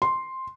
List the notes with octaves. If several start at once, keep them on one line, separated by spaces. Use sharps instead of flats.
C6